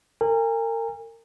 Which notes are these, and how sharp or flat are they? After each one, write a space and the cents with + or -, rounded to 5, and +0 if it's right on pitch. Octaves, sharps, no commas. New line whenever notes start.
A#4 -35 G#5 -40